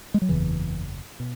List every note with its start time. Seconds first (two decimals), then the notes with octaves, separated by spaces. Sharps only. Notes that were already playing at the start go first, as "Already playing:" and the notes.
0.14 G#3
0.22 F#3
0.29 F#1 E2 C#3 E3
1.20 B2